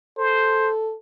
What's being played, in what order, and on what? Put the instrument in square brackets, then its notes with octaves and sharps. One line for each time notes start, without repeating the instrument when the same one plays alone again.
[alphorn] A4 [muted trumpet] C5